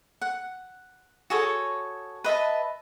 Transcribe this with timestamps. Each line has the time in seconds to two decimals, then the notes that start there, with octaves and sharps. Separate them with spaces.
0.21 F#5
1.30 F#4 G#4 A4 C#5
2.24 B4 D#5 E5 A5